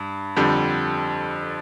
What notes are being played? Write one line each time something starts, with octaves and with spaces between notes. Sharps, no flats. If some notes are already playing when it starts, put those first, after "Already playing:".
Already playing: G2
F2 D3 G3